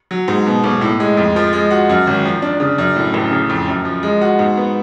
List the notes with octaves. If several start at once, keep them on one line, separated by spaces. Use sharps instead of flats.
F#3
G#2
B2
B1
A2
G#3
F2
F3
G#3
F#4
F#2
G#1
F3
D4
C#3
F#2
A2
A1
C#3
F2
F#2
F3
G#3
F#4
G#2
B3